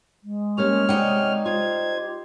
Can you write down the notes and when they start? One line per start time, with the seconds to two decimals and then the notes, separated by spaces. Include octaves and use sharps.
0.22 G#3
0.58 G3 A#3 C#4 C#5 F6
0.89 C3 G3 D#4 F#5 G5
1.46 F4 C5 G#6
1.89 G4